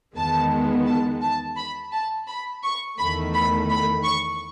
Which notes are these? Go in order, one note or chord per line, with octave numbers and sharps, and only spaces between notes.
E2 D#3 G#3 B3 A5
A5
A5
B5
A5
B5
C#6
E2 D#3 A3 B5
B5
B5
C#6